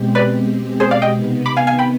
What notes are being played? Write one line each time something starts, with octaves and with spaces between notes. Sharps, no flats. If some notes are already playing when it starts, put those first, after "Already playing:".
Already playing: B2 G#3 C4 G4
B4 D5
G#4 C5
D5 F5
D#5 G5
C3 D#3 B3
B5 D6
F5 G#5
F5 G#5
G5 B5